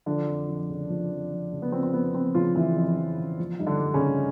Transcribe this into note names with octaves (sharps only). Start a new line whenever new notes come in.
D3 F3 D4
F2
F2
C#3
F3
F2
F2
C#3
B3
F3 C4
C4
F2 B3
F2 C4
C#3 F3 F4
E3 F3 E4
F2
F2
C#3
F3
G2 D#4
D3 D4
G2
C#3 C#4
D3